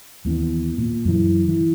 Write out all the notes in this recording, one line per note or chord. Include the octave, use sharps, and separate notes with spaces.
D#2 E3 B3
A#2
F#2 E3
E3